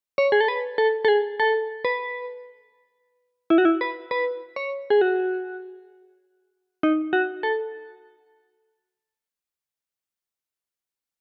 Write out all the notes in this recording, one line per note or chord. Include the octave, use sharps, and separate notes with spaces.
C#5
G#4
A4
B4
A4
A4
G#4
A4
B4
E4
F#4
E4
B4
B4
C#5
G#4
F#4
D#4
F#4
A4